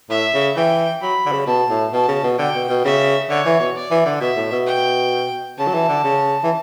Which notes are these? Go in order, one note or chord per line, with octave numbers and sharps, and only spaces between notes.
A2 E5
C#3
E3 G5
F#3 B5
D3
C#3
B2 A5
A2
B2 A5
C#3
B2
D3 G5
B2
B2
C#3 E5
D3 C#5
E3
B2
D5
E3
D3
B2 E5
A2
B2
G5
C#3 A5
F#3
E3
D3
C#3
E3